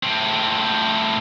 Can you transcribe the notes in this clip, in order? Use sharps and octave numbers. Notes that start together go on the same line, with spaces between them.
A2 C4